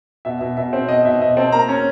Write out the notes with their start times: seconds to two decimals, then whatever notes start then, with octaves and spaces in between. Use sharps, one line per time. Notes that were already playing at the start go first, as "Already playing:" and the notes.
0.25 B2 E5
0.41 B2
0.57 B2 E5
0.73 C4
0.88 B2 D#5
1.05 B2 E5
1.21 B2 D#5
1.37 C4 A5
1.52 A#3 A#5
1.69 C#4